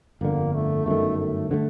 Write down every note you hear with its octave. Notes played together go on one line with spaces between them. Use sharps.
G1 F2 D3 A#3
A3
G1 F#2 D#3 A3
A3
D3 F3 A3